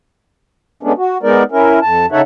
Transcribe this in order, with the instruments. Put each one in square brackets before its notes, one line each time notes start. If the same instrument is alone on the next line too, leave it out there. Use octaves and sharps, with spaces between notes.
[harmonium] G#3 A3 B3 C#4 D4
F#4
G#3 B3 D#4 A#4 D5
C#4 E4 A#4
F2 A5
C#3 D#4 A4 C#5 E5 F#5